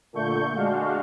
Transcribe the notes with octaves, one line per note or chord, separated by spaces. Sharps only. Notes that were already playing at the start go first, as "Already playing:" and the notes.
A#2 D3 A3 C#6 G6
G#3 D4 F#4 F5